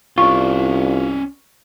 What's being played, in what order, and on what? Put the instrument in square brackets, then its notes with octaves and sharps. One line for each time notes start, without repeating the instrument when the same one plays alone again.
[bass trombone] C2 [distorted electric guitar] C#4 D5 [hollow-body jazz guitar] F4 [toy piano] C#6